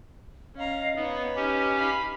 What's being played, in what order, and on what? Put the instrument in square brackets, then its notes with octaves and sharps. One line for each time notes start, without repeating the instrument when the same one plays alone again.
[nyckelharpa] C#4 A#5 [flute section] D#5 F5
[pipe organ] B3 [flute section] D#4 [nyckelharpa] B4 C#5
[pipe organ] C#4 G4
[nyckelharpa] F5 B5